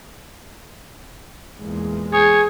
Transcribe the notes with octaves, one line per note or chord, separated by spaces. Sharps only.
E2 A#2 G#3
G#4 C#5